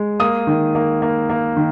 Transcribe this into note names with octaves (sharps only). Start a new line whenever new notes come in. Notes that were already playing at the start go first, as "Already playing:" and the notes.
Already playing: G#3
A#3 D#6
D#3
A#3
A#3
A#3
D#3